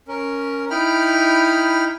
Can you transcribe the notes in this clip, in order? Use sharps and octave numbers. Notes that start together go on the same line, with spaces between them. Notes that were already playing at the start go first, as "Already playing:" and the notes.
C#4 A#4
D#4 E4 G5 B5 F6